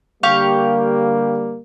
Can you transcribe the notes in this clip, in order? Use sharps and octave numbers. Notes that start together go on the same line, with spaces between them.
D3 G3 A#3 G4 F5 C#6